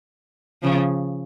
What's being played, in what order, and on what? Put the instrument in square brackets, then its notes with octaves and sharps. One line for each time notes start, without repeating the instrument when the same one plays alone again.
[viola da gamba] C#3 F3